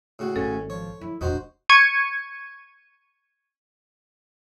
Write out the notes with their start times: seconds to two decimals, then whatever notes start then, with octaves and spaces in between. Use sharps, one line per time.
0.19 A2 C#3 F#4
0.36 G#1 G3 C#4 A4
0.70 F3 C#5
1.01 F3 E4
1.21 E1 A#2 D4 D#4 F#4 C5
1.69 C#6 G#6 C#7 D#7